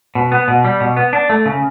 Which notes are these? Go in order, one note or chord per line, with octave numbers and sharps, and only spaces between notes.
B2
B3
B2
G3
B2
B3
D4
A3
C#3